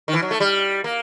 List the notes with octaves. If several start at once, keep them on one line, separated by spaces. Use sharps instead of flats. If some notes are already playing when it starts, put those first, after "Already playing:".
D#3
E3
F#3
A3
G3
A#3